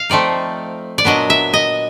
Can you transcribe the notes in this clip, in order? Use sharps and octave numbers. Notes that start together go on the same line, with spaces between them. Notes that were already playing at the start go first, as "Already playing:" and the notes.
Already playing: F5
F3 A3 C4 D#4 D5
D5
A#2 F#3 B3 D4 D#5
E5
D#5